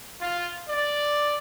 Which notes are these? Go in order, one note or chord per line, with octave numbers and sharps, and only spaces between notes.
F4
D5